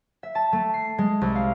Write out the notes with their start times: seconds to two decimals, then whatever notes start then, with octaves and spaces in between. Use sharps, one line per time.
0.23 E5
0.35 A5
0.53 A3
0.74 C7
0.98 G#3
1.21 C2
1.35 F5